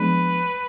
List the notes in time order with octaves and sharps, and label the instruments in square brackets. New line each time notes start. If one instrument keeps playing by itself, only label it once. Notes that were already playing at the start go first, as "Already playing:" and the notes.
Already playing: [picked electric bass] F3 G#3 B3 D4 [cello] B4